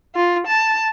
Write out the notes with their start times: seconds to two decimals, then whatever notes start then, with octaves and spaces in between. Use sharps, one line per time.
0.16 F4
0.47 A5